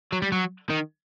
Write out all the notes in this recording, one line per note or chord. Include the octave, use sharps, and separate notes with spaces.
F#3
G3
F#3
D#3